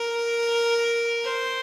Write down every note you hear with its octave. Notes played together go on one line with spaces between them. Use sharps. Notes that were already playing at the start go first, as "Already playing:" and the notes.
Already playing: A#4
C5